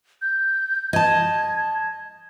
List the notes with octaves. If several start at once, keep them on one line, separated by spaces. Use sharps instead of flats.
G6
D#5 A5 G#6